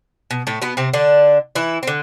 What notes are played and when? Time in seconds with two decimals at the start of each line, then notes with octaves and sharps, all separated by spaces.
0.31 B2
0.47 A2 A3
0.62 B2 B3
0.77 C3 C4
0.93 D3 D4
1.55 E3 E4
1.83 C4
1.87 D3